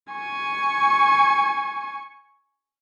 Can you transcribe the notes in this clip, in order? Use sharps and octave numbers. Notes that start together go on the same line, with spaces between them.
G#5 C#6